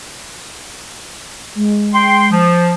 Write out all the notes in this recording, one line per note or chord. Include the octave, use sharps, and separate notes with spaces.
G#3
G5 C6
F3